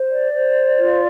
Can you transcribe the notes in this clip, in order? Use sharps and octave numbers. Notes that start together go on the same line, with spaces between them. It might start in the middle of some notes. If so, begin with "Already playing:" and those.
Already playing: C5
D5
C5
F4